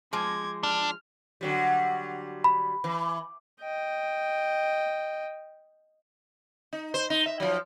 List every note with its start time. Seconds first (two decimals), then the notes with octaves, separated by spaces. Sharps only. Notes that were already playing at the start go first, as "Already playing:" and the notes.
0.13 F3 G#3 D6 G#6
0.63 D4 F6
1.41 D3 F#3 G3
2.44 B5
2.84 E3
3.62 D#5 G5
6.73 D#4
6.94 C5
7.10 D#4
7.26 E5
7.40 F3 F#3